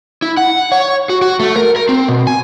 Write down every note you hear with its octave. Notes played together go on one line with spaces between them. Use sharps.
E4
F#5
C#5
F#4
F#4
A3
A#4
A#4
C4
B2
G#5